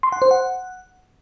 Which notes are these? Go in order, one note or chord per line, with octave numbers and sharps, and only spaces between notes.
C6
F#5
C5
F#5